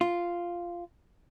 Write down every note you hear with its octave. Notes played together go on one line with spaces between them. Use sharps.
F4